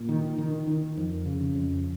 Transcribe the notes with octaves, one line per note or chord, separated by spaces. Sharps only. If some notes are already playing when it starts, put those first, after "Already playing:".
Already playing: A#2
D#3
D#3
D#3
F2
C#3
F2